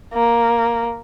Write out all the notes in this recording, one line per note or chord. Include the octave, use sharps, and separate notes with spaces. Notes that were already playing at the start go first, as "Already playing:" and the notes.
A#3